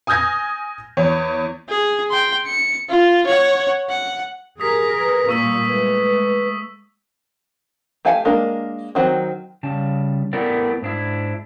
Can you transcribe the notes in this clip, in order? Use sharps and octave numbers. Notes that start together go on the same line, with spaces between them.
G#5 D#6 F6 G6 G#6 A#6
E2 C#5
G#4
G5 C6
C#7
F4
C#5 F#5
F#5
G4 G#4 A#4 D#6 B6
B4
A#2 G3 A#3 C#6 E6 B6
G#3 A3 B4
A3 G4 F5 G#5 A5
G#3 A#3 D4 A#4
D#3 F#3 C4
C#3 G3 A5
A3 B3 E4 G4 A#4 D5
G#2 D4 E4